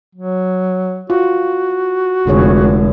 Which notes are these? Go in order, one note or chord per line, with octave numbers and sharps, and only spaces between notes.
F#3
F4 F#4
F1 D3 G#3 G#4 C#5